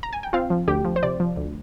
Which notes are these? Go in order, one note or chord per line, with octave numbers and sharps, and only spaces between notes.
A#5
G#5
G5
C4 F4 F5
F3
D2 G4 G5
F3
C5
C3 D5
F3
D2